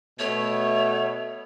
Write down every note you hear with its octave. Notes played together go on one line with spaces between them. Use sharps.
B2 A3 C#5